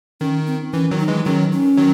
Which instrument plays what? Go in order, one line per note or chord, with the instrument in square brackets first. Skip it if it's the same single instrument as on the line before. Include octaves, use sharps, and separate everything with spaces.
[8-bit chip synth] D#3 [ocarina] C#4
[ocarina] C4
[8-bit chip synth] E3 [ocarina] C#4
[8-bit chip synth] D#3 F#3
[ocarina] D#4
[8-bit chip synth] E3 G#3
[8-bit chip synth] D#3 F#3 [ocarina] C#4
[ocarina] C#4
[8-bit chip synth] D#3 F#3